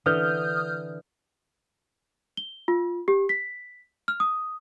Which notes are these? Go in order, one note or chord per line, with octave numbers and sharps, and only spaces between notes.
D3 E3 D#6 F6 G6
G7
F4
G4
B6
F6
D#6